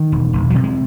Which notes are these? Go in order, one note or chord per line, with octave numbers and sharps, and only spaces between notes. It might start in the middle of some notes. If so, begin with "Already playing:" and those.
Already playing: D#3
E1
E1
C3 F#3
G#3